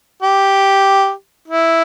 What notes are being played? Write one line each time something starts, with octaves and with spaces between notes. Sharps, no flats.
G4
E4